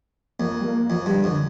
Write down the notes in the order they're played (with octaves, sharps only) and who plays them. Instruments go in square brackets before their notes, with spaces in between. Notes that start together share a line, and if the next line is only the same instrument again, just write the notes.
[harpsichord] F2 [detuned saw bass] A#3
[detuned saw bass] G3
A#3
[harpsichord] F2 [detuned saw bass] F3
[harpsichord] G2
[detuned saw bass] D3
[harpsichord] F2